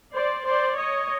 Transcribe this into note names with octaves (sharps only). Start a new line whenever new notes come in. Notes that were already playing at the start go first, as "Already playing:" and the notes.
C5 D5
C5 D5
C#5 D#5